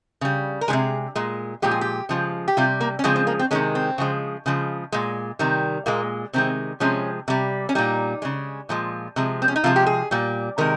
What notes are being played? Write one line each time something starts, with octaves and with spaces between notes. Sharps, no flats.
C#3 G3
A#4
D#3 G#3 G#4
C3
A#2 G#3
A#2 F3 G#3 G4
G#4
G4
C#3 F3 G#3
G4
C3 G3 F4
A#3
C#4
C#3 F3 G#3 C4
C4
A#3
C4
C3 D#3 G#3 C#4
C4
C#3 F3 G#3
C#3 F3 G#3
A#2 G#3
C3 D#3 G3
A#2 G#3 A#3
C3 D#3 G#3 C4
C3 F3 G#3 C#4
C3 G3
C#4
A#2 G3 D#4
C#3 G#3
A#2 F3 G#3
C3 F3 G#3
C4
C#4
D#4
C3 F3 G#3 F4
G4
G#4
A#2 G3
C3 D#3 G#3 A#4